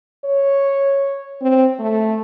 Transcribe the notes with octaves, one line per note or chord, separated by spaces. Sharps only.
C#5
C4
A3